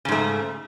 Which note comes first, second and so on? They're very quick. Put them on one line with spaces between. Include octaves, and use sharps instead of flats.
C#3 G#2 A3